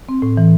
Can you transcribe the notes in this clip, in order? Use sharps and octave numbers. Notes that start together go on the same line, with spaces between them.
C4
A2
E3